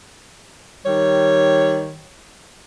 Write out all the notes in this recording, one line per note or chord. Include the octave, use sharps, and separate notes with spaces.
D#3 G3 C#5